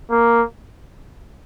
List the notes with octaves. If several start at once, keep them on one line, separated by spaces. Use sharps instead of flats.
A#3